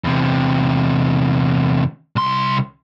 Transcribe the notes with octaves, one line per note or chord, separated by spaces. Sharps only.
E2 C3
C2 C6